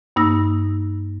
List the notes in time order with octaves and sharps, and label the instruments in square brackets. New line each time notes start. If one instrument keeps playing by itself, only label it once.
[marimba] G2 A#3 D#4 E6 A#6